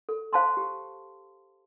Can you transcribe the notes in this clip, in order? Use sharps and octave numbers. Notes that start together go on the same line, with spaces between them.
A4
C5 F5 A5 C6
G4